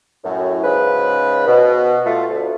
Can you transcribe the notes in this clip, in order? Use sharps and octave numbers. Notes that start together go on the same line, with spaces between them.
F#2 A2
G#2 C#3 B4
B2
A3 F4
D2